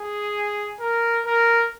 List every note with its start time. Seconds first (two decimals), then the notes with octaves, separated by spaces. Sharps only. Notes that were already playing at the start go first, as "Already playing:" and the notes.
Already playing: G#4
0.80 A#4
1.25 A#4